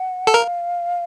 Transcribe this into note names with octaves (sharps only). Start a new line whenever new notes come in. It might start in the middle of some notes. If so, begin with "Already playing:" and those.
Already playing: F#5
A4
A#4 F5